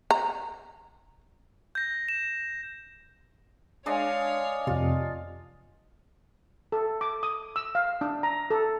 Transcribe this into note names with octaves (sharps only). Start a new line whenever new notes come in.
A#5
G6 A#6
E7
G#3 D4 C#5 D#5 F5
F2 C3 F4
A4
D6
D#6
E6
F5
D4
A#5
A4